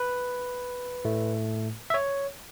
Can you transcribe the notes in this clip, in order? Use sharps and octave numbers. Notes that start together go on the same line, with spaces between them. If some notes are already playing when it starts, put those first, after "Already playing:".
Already playing: B4
A2 A3
E5
C#5